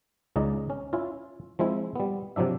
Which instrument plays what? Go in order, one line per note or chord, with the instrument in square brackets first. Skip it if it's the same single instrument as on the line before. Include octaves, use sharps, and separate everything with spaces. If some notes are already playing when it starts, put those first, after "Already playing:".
[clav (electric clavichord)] C#2 C#3 D#4 D5 D#5
C#4
C#4 E4 F4
F3 G#3 C4 E4
G3 B3
C3 F3 F#3 D4 E5